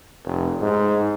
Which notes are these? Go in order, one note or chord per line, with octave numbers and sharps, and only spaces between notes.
F1
G#2